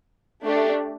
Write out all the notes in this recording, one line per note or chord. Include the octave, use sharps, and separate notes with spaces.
A3 D4 G4